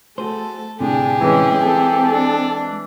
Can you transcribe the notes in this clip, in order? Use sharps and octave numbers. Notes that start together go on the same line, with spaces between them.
A3 F#4 G#4 A4 C5
D2 A2 C3 D4 G4 G#4
E3 G#3 C#4
G#3 C4 A4
D4